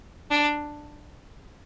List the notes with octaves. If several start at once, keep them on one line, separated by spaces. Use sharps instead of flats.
D4